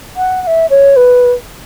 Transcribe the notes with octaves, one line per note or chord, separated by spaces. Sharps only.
F#5
F#5
E5
C#5
B4